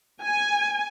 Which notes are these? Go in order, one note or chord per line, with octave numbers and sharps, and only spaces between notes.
G#5